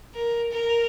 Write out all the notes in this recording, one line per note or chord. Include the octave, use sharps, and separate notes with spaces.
A#4
A#4